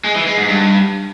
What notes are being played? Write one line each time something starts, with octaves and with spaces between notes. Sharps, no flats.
G#3
E3
G#3
G#2
G2